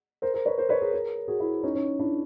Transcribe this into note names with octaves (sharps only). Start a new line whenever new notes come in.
A#4 C5
A#4 C5
B4 C#5
A#4 C5
B4 C#5
G#4 A#4
G#4 A#4
F#4 G#4
E4 F#4
C#4 D#4
C#4 D#4
D4 E4